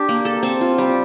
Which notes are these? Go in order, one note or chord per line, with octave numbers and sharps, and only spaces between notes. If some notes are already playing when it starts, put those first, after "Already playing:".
Already playing: D4 G4
A#3
A4
C4
F4
G3